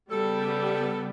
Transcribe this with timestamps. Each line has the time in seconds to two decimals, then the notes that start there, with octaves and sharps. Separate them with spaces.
0.11 C#3 G3 B3 A4